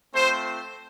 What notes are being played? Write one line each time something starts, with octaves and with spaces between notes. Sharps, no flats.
A3 C4 F4 C5